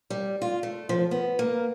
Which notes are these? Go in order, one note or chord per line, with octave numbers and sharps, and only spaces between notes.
G3
F4
A3
F3
B3
A#3